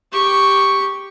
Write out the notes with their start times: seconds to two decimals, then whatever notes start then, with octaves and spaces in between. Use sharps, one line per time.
0.12 G4 C#6